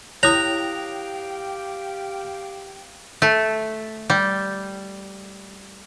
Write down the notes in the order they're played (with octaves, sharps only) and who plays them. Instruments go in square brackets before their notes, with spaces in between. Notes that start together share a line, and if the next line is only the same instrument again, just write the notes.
[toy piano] E4 C#5 [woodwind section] G4 F5 G5 [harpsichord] A#5 [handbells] D#6 F#6
[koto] A3
G3